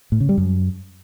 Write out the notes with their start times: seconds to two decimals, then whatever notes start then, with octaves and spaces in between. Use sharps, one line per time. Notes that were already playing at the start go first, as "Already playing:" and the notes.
0.12 A2
0.20 C#3
0.29 G3
0.37 F#2